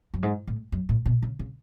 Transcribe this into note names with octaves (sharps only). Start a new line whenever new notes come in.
F#2
G#2
A2
F#2
A2
B2
C#3
C#3